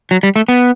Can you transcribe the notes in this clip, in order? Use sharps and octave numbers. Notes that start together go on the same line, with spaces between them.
F#3
G3
A3
B3